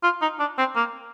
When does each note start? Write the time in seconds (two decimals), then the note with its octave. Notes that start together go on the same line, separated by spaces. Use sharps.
0.03 F4
0.22 D#4
0.40 D4
0.58 C4
0.76 A#3